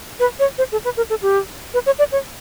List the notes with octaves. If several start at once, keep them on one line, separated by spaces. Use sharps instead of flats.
B4
C#5
C5
A4
B4
A#4
A4
G4
B4
C#5
D5
C#5